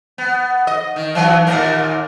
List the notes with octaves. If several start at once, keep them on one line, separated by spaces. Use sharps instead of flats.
B3
D#5
D#3
E3 F#3 B3
D#2 A#2 A#4